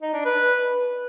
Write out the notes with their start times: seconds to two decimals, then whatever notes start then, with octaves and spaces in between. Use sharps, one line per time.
0.02 D#4
0.14 D4
0.25 B4